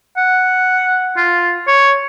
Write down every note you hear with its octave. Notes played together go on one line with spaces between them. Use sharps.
F#5
F4
C#5